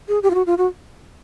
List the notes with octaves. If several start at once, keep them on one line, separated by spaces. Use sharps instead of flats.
G#4
G4
F4
F#4
F4
F#4